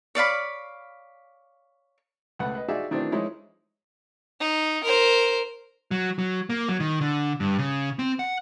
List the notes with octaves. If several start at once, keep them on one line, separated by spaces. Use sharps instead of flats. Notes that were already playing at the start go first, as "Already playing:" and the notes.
C#5 D5 F5 B5
C#2 A3 B4 F#5
B4 D#5
D#4 F4 F#4 G#4 D5 E5
D#3 E3 F#3 A3 C4 D4
E3 F3 G#3 D#4 E4 C#5
D#4
A#4 C5
F#3
F#3
A#3
F#3
D#3
D3
G2
C#3
C4
F#5